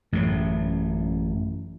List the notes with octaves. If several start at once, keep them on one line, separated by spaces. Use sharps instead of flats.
A1 F#2 A2